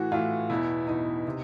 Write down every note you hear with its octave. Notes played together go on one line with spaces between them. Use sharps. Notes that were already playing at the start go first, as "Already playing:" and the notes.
Already playing: A2 E3 F#4
A2 E3 F4
E2 B2 E4
E2 B2 D#4
C3